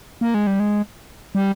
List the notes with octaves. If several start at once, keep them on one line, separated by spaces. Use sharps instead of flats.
A#3
G#3
G3
G#3
G3